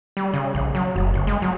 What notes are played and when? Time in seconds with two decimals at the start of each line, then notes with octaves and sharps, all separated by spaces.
0.17 G3
0.34 C#3
0.55 A#1
0.75 F#3
0.96 F#1
1.14 G1
1.27 G#3
1.42 F#3